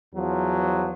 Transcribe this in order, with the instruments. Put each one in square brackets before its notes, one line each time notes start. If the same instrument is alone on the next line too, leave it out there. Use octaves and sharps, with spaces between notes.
[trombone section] E2 F3 F#3